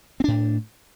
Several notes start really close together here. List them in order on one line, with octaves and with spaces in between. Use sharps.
C4 D4 A2